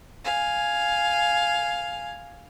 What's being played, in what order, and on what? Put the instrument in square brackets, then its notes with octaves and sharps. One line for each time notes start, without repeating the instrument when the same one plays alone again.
[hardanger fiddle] F5 G#5